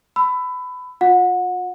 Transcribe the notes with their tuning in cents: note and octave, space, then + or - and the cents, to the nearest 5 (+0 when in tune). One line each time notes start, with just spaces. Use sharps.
B5 +20 E6 +5
F4 +35 F#5 -25